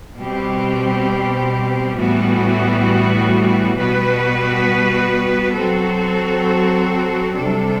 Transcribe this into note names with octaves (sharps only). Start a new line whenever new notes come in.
B2 G3 C4 G4
A2 E3 G3 B3 F#4
B2 G3 B3 F#4 B4
F#3 C4 F#4 A4
C3 G3 D4 A4